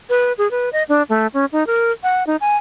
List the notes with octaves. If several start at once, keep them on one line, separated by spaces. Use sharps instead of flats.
B4
G#4
B4
D#5
D4
A3
C#4
D#4
A#4
F#5
D#4
G#5